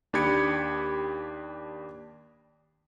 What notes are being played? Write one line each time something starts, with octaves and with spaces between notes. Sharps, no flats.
D#2 D4 G4 B5 G#6 C#7